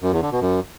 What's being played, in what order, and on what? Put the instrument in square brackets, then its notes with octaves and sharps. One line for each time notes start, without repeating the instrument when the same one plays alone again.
[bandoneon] F#2
E2
D3
B2
F#2